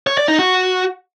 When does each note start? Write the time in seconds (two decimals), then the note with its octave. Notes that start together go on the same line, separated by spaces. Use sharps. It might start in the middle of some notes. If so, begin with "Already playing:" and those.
0.07 C#5
0.17 D5
0.28 D#4
0.39 F#4